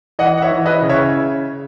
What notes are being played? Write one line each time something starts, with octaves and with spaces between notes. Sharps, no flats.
E3 D#5 F#5
F#5
C#5 E5
E3
B4 D#5
C#3
C#5 E5